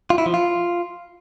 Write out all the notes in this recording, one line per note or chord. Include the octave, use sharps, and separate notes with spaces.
F4
E4
F3
F4